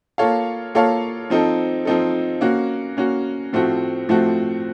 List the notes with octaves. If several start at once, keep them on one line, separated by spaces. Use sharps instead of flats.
A#3 F4 A4 C#5 F5
A#3 F4 A4 C#5 F5
F3 C4 D#4 A4
F3 C4 D#4 A4
A#3 C#4 F#4
A#3 C#4 F#4
A2 F3 A3 C4 F#4
A2 F3 A3 C4 F#4